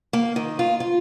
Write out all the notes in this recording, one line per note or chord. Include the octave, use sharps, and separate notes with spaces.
A#3
D#3
F4
F4